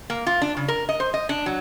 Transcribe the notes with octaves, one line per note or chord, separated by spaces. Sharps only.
A#3
F4
D4
C#3
A#4
D#5
C5
D#5
D4
F#3